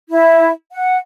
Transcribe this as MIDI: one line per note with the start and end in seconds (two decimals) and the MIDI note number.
0.09 0.51 64
0.72 0.97 78